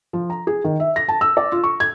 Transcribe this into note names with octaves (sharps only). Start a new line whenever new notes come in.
F3
A#5
G#4
D#3
E5
A#6
A5
E6
D5
F4
C#6
G#6